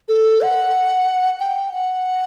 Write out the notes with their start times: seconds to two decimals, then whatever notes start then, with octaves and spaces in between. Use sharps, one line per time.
0.09 A4
0.42 F#5
1.40 G5
1.73 F#5